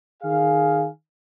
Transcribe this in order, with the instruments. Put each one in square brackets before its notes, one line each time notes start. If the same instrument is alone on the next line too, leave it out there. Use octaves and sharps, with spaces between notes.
[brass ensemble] D#3 G#4 F5